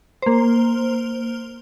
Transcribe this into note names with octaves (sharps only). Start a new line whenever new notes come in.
A#3 C5